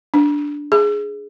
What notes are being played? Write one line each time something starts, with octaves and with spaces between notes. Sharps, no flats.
D4
G#4